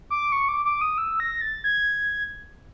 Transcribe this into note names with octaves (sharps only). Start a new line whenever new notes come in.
D6
C#6
D6
D6
D#6
E6
A#6
A6
G#6